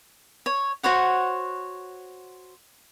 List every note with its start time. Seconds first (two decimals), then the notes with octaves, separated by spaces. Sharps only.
0.46 C#5
0.83 F#4 C5 C#5 F#5